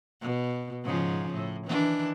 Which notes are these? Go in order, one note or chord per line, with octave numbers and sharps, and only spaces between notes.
B2
G#2 C#3 F3
A2
D#3 E3 D4